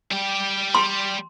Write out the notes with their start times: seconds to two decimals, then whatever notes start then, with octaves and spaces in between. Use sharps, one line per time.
0.11 G3 G4
0.75 C6